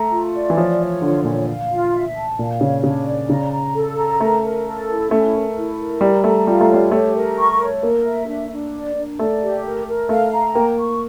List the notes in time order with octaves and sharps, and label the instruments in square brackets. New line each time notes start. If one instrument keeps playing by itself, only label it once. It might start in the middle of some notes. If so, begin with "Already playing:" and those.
Already playing: [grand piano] A3 [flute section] A#5
[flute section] F4
D5
[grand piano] E3
[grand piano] F3 [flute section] C#5
[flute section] C#5
[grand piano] D3 [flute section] F4
[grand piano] A#2 [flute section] C#5
[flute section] F5
F4
E5
A5
[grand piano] A#2 [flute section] F5
[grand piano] C#3 [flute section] C#5
[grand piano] C#3 [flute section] D4
[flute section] D5
[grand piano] C#3 [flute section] A#5
[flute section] A#5
A4
A#5
[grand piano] A3 [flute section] A#4
[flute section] A#4
A4
E4
[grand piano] A3 [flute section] C#4
[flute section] A#4
E4
A#4
[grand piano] G3 [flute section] A#5
[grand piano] A3 [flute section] A#5
[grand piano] G3 [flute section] F4
[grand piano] A3
[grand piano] G3 [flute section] C#5
[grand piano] A3 [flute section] G4
[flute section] A#4
C#6
C#5
[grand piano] A#3 [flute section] A#4
[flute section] E5
D4
D4
D5
D4
[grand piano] A3 [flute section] D5
[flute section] G4
A#4
A#4
[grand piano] A3 [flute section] F5
[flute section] A#5
[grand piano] A#3 [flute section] G5
[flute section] C#6